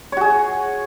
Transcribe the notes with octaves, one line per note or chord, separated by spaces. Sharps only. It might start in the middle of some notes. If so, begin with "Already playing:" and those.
F#4 G#4 C#5